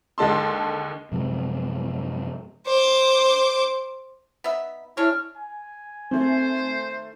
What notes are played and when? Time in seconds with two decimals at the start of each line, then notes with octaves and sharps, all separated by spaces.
0.18 D#2 D3 G#3 A5 C6
1.12 F#2 C3 F3 G#3
2.67 C5 D6
4.44 B3 D#4 E5
4.97 G#3 D4 E4 C#5 F6
5.36 G#5
6.11 D#3 A3 C4 C5